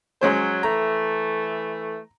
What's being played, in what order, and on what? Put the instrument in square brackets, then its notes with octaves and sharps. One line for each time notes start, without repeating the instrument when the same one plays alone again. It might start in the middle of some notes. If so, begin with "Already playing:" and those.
[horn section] F#3 [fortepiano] G#3 C#4 C5
[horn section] E3 A3 [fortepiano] A#5